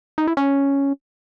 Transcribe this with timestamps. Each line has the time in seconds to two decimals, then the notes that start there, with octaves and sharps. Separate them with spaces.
0.18 D#4
0.27 E4
0.37 C#4